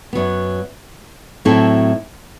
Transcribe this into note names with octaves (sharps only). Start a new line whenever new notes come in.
F#2 F#3 B3
A2 F#3 C4 E4 A4